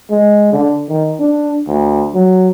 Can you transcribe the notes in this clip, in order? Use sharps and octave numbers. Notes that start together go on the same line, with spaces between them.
G#3
D3
D#3
D4
D2
F#3